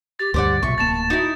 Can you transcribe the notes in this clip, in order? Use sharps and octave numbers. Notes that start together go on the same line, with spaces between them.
G4 A6
D2 G2 G4 C5 D5 F#5
B1 A#2 E5 C#6
D1 A#3 A5 A6 E7
D#4 E4 F#4